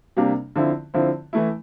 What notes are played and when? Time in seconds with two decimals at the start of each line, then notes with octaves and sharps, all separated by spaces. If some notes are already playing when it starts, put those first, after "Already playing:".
0.17 C3 G3 A#3 D4
0.56 D3 F3 C4 E4
0.94 D3 F3 C4 E4
1.33 E3 A3 E4